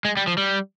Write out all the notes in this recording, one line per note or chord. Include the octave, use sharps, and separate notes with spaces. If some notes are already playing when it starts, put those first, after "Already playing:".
G#3
G3
F3
G3